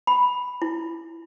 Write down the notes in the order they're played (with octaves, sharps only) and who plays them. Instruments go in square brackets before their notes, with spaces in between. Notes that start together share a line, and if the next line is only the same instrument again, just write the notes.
[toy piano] B5
E4